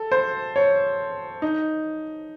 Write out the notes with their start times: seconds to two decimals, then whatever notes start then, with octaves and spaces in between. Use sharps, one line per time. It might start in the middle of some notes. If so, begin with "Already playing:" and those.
Already playing: A4
0.12 C5
0.56 C#5
1.42 D#4